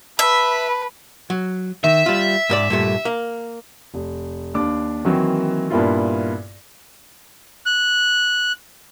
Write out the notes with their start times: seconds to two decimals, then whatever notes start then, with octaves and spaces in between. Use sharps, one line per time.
0.19 B4 E5 A5 B5
1.30 F#3
1.84 D#3 E5
2.06 G3 F4
2.50 G#2 A#4 D5
2.70 G2 A#2 A3
3.05 A#3
3.94 F1
4.54 D#2 D4 D6
5.05 D#3 E3 F#3 A#3 C4
5.70 G2 A#2 A#3 B3 E4 F4
7.66 F#6